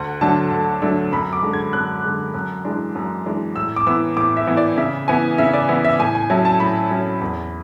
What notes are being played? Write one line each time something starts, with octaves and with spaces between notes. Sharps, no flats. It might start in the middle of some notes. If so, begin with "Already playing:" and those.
Already playing: D2 F#5
D3 F#3 A3 D4 A5
D2
D3 F#3 A3 D4
F#2 B5
D6
D3 G#3
G#6
F#2 F#6
D3 G#3
F#2
E3 G#3 D4
F#2
E3 G#3 D4
A2 E6
D6
E3 B3 E4 E6
A2 D6
E5
E3 B3 E4
D5
C#3 E5
E3 B3 E4 G#5
C#3 E5
D5
E3 B3 E4 E5
E5
A2 G#5
G#5
F#3 C#4 E4 A5
A5
A2 B5
F#3 C#4 E4
E2